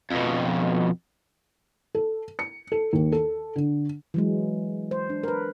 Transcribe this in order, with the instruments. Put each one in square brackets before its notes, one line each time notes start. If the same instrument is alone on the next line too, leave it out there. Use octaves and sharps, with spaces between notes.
[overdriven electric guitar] F2 B2
[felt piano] A4
C#7
A4
D#2
A4
D3
[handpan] E3 F#3 G#3
C5
D4
A#4 B4